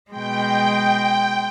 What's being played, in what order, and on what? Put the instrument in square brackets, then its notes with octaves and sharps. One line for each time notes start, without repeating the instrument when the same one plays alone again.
[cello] B2 G#3 [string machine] G5